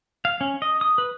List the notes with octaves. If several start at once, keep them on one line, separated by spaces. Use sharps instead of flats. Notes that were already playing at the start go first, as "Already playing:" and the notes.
F5
C#4
D#5
D#6
B4